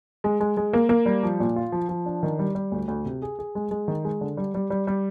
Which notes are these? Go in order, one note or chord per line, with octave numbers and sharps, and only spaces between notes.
G#3
G#3
G#3
A#3
A#3
G3
F3
A#2
F4
F3
F3
D4
D#3
G3
G3
D2
D2
C3
G#4
G#4
G#3
G#3
D#3
G#3
D3
G3
G3
G3
G3